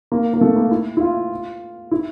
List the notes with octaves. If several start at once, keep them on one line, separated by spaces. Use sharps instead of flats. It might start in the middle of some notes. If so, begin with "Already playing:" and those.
A#3
A#3
A3
A#3
E4
E4
F4
E4